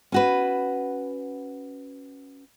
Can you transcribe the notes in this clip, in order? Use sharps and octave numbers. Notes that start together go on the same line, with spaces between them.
C#4 F#4 B4